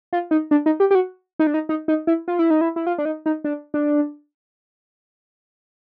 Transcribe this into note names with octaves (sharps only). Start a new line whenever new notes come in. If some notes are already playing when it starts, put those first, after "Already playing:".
F4
D#4
D4
D#4
G4
G4
F#4
D#4
D4
D#4
D#4
D#4
E4
F4
E4
D#4
E4
E4
F4
D4
D#4
D#4
D4
D4